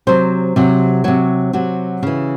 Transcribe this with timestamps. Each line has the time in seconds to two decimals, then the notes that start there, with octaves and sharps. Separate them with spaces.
0.07 C3 F#3 C5
0.56 C3 F#3
1.04 C3 F#3 C#5
1.53 C3 F#3 F#4
2.03 C#3 E3